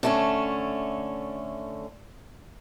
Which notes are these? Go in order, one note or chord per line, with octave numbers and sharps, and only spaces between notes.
D3 A3 C#4